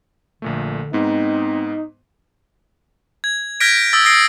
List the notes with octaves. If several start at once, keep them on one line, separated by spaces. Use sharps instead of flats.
A#1 A#2 D3 A3
G#2 B3 C4 D#4
G#6
F6 G6 G#6 A#6 B6 D7
D#6 E6 A6
D#6 A6 A#6 C7 D7